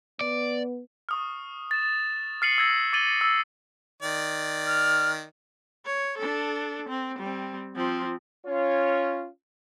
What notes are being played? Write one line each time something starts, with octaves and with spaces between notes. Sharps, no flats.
B3 D5
C#6 D#6 F6
A6 E7
F6 A6 C7 C#7 D#7 F#7
E6 G#6 A#6
D6 G#6 A6 D#7 F#7 G7
E6
D#3 D5
F6
C#5
D4 A4
C4
G3 C4
F3 C4
C#4 F4 C#5